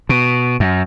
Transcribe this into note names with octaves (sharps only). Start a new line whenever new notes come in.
B2
F#2